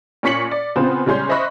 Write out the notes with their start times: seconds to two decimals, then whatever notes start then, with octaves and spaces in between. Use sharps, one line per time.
0.23 A#2 C#4 C#6 B6 C#7 F#7
0.51 D5
0.76 C#3 B3 C4 F4 G#4 C5
1.06 C#3 G3 G#3 C#4 C6 G6
1.29 C5 D#5 E5 B5 C#6 F#6